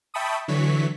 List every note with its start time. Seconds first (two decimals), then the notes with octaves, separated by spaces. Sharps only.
0.14 E5 G5 A5 B5 C#6 D#6
0.48 D3 E3 F#3 C#6 B6